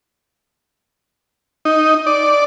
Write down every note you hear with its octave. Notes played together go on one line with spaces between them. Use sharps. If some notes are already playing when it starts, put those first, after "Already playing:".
D#4
D5